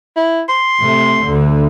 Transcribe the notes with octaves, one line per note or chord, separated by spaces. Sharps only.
E4
C6
C3 A3
D2 D3